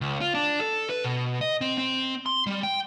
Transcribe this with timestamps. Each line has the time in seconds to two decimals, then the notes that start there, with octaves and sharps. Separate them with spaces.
0.01 C#2
0.21 F4
0.35 D4
0.60 A4
0.90 B4
1.04 B2
1.41 D#5
1.61 C4
1.78 C4
2.26 C6
2.47 G3
2.63 G5